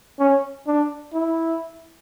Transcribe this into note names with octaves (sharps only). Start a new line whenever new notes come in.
C#4
D4
E4